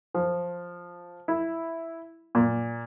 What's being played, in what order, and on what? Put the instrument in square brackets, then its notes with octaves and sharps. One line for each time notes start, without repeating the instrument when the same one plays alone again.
[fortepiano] F3
E4
A#2